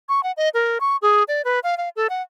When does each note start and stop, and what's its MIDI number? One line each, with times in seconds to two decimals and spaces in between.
0.09 0.23 85
0.23 0.32 78
0.37 0.49 75
0.54 0.78 70
0.80 0.97 85
1.02 1.23 68
1.28 1.42 74
1.45 1.59 71
1.63 1.77 77
1.78 1.89 77
1.96 2.07 69
2.10 2.22 78